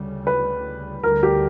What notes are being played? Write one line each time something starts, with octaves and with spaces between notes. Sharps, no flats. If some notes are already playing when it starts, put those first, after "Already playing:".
Already playing: D2 C#3 G3
B4
D2 D3 G3 A#4
G4